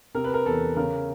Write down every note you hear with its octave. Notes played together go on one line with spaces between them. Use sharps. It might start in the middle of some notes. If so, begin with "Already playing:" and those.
C3 A#4
B4
A#4
E2 A4
C#3 A#4